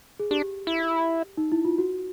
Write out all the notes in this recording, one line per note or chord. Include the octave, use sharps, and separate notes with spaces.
G#4
D4 G4
E4
D#4
E4
F4
F#4